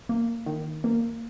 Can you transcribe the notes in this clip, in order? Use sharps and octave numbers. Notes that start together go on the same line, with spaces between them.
A#3
D#3
A#3